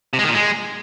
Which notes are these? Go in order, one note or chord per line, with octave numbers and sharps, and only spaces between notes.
C3
G#3
D#3
A#2
G#3